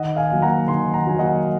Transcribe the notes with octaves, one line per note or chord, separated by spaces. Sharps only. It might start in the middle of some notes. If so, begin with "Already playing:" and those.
Already playing: D#3 D#5 F#5
F5 G#5
F#3 A#3
F#5 A#5
D#3 G#5 C6
F#5 A#5
F#3 A#3 G#5
D#5 F#5